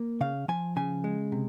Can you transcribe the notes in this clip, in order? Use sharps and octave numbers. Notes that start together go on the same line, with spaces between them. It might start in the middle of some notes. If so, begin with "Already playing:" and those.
Already playing: A#3
C#3 F5
F3 G#5
C#3 G#5
G#3
C3